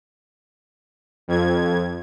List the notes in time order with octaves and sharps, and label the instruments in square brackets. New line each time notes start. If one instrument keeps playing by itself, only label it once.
[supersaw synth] F2 G#6